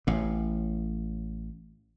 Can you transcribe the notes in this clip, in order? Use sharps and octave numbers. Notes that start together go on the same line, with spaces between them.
A1 A2